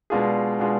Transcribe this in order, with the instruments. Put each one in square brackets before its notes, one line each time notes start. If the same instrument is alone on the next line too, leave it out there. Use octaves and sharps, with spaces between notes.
[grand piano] B2 G#3 D4 F4 G#4
B2 G#3 D4 F4 G#4